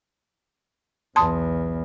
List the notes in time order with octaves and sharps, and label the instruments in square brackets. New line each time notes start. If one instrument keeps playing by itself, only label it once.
[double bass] B1 E2 [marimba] A5 C6 D#6